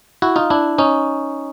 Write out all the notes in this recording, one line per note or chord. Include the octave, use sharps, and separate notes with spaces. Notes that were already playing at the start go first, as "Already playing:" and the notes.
E4 F#4
D#4 F4
D4 E4
C#4 D#4